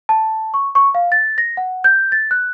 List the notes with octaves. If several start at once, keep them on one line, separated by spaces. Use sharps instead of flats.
A5
C#6
C#6
F5
A6
A#6
F#5
G6
A6
F#6